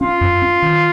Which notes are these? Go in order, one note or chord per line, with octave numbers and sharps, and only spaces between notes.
C#4 F4
F#2
C#4
D#3